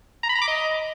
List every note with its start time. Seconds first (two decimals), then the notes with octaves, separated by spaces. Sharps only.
0.23 A#5
0.29 B5
0.35 A#5
0.41 D6
0.48 D#5